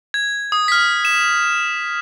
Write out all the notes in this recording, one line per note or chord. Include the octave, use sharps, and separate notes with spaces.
G#6
D#6
F6 B6
E7